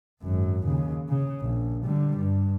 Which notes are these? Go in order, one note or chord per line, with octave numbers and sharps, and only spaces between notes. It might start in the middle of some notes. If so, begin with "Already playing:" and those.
G#1 F#2
D#2 C#3
C#3
A#1
D3 G3
G2